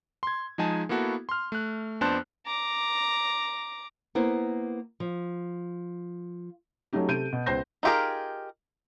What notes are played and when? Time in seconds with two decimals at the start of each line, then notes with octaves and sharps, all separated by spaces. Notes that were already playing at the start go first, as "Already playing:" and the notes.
0.23 C6 G#6
0.58 F3 G#3 D#4 G#4 G#5 A5
0.89 A#3 B3 E4 F#4 A4
1.29 C6 F6
1.52 A3 F#6
2.01 F2 B3 D4 C5 A5 F#6
2.46 A#5 D6
4.15 A#3 B3 E4 C5
5.00 F3
6.93 F#3 A3 C#4 D#4 G4
7.08 C3 A4 G6 D7 D#7
7.33 B2
7.46 C#2 B3 C5 C6 G6 A#6
7.83 D#4 F4 G4 G#4 A#4